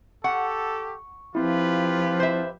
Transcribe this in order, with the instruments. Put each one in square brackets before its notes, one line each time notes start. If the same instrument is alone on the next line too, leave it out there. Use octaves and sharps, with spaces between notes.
[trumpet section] G4 A4 [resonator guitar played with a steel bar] F#5 [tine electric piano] C#6
[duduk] F3 [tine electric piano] C4 E4 [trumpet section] F4 G4 B4
[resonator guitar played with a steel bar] C5 E5